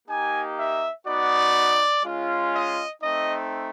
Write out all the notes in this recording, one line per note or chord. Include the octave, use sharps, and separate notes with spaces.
A#3 D#4 G4 G#5
E5
B3 D#4 F#4 D5
G#3 C#4 F4
D#5
A3 C4 D#4 D#5